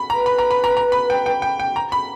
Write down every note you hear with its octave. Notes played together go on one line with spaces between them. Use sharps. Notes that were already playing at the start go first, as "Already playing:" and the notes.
Already playing: B5
A#5
B4
B5
A#5
B5
A#5
A#5
B5
G5
G5
G5
G5
A#5
B5